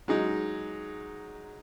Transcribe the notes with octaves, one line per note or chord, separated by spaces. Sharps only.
F#3 G#3 D#4